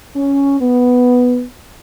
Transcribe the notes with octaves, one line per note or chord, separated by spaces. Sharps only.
C#4
B3